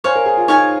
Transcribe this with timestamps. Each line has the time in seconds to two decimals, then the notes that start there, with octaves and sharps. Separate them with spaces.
0.04 C5 C#5 F5 G#5
0.15 A#4
0.26 G#4
0.37 F4
0.48 D#4 C#5 F5 G#5